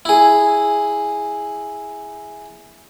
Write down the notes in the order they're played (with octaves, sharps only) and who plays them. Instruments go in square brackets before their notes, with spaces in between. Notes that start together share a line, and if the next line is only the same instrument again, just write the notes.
[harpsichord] E4 G#4